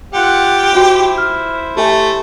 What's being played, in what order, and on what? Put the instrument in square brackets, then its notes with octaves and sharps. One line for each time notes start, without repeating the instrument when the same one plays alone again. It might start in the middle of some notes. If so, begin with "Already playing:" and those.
[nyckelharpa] F4 F#5 [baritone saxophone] G4
[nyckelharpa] E4 C5 [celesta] F#4 G5
[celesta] F6
[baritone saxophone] A3 [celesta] G4 E5 G#5